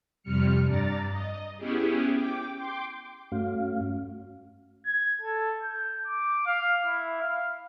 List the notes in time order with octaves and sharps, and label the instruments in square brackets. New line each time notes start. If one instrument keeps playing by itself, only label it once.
[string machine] F2 C3 G3 F6 C#7
G2 D5 A#5 A6
D#5
B3 C#4 E4 G4 G#4
G5 D6
G5 C6 D6
[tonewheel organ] G2 A3 C#4 F#4 F5
[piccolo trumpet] G#6
A4
G6
D6
F5
E4
F5